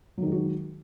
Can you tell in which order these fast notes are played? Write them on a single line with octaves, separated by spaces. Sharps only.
F#3 D#3 G#3 F#4